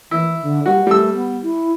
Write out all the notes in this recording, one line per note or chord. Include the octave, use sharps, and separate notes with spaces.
E3 E4
D3
G3 F#4
G3 A3 E6
B3
E4